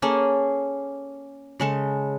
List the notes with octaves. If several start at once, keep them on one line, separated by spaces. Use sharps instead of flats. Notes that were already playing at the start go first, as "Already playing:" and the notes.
A#3 C#4 G#4 A4
C#3 G#3 A4